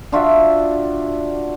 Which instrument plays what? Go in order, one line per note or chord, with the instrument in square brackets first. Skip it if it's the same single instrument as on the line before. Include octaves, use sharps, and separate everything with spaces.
[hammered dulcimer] D4 F4 F#4 E5